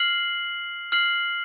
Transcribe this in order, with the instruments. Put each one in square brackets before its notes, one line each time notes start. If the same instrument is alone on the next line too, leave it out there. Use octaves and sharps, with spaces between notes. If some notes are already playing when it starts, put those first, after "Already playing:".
Already playing: [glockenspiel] F6 C7 F#7
F6 C7 F#7